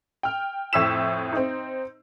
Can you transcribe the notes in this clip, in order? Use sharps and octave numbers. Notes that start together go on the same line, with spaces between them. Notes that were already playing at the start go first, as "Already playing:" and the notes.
G5 F6
F2 A2 C#6 E6 B6 E7
C4 D#4